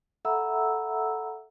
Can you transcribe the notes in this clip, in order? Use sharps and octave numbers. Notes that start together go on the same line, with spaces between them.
A4 E5 F#5 A#5 B5 E6